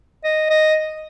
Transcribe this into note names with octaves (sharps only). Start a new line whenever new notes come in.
D#5
D#5